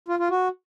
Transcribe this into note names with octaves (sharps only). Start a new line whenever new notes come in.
F4
F4
F#4